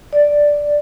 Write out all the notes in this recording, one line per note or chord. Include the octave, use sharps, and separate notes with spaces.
D5